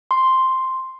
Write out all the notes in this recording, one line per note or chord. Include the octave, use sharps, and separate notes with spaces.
C6